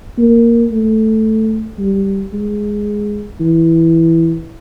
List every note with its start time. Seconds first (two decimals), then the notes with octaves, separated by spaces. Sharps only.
0.18 A#3
0.72 A3
1.79 G3
2.33 G#3
3.40 E3